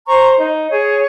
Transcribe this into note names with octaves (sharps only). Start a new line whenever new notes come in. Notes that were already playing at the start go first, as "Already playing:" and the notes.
C5 A#5 C#6
D#4
G#4 C#5